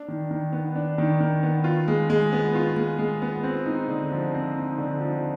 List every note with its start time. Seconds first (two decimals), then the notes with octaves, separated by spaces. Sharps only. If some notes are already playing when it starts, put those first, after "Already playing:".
Already playing: D4
0.08 D#3
0.31 D#3
0.52 B3
0.76 D4
0.98 D#3
1.21 D#3
1.43 B3
1.64 F4
1.88 G#3
2.10 G#3
2.32 B3
2.55 F4
2.77 G#3
2.99 G#3
3.22 B3
3.43 C4
3.66 D#4
3.88 D3
4.11 F3
4.34 C4
4.56 D#4
4.78 D3
5.01 F3